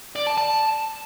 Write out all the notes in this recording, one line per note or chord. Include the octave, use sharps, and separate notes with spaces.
D5
A5
A5